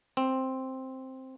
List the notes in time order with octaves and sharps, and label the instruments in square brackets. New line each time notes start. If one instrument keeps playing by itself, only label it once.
[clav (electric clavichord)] C4